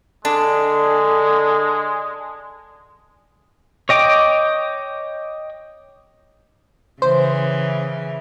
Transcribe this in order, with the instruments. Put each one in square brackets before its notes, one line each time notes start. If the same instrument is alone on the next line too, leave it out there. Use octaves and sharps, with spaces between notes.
[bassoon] D3 [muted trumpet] G#3 [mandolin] D4
[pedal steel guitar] C#5 D#5 G5 D6
[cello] C#3 E3 [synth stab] C5